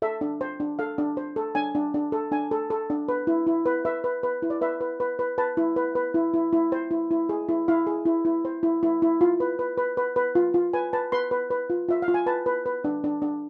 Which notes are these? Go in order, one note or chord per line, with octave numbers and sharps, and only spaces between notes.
A4 E5
D4
C5
D4
A4 F5
D4
C5
A4
D4 G#5
D4
D4
A4
D4 G#5
A4
A4
D4
B4
E4
E4
B4
B4 E5
B4
B4
E4
D5
B4 E5
B4
B4
B4
B4 A5
E4
B4
B4
E4
E4
E4
C5
E4
E4
G#4
E4
E4 F5
G#4
E4
E4
C5
E4
E4
E4
F4
B4
B4
B4
B4
B4
F4
F4
B4 G#5
B4 A5
B4 C6
B4
B4
F4
F4 E5
F5
F4
G#5
B4 A5
B4
B4
D4
D4
D4